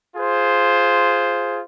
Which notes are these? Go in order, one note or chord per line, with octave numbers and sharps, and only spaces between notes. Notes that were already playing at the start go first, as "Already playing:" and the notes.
F4 G#4 C5